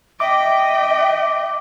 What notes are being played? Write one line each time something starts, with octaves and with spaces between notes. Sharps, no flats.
D#5 E5 G5 D6